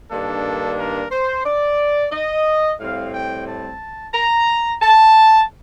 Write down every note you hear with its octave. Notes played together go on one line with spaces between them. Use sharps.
G2 D#3 A#3 D4 A4
A#4
C5
D5
D#5
A2 G3 C4 F5
G5
A5
A#5
A5